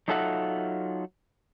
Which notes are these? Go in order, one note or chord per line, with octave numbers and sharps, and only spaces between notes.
F#3 D#4 F4 A4 E5 F#5